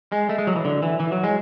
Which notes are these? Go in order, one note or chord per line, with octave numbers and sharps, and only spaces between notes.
G#3
A3
G#3
F#3
E3
D3
E3
E3
F#3
G#3